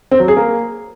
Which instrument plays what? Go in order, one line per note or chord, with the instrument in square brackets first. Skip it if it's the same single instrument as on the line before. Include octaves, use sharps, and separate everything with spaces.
[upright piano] C4
F#3
G#4
A#3